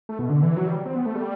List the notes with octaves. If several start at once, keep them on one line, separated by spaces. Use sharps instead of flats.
A3
B2
D3
E3
F#3
G3
C4
B3
A3
G3